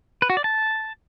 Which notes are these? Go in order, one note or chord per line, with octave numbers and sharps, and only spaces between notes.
B4
F#4
D5
A5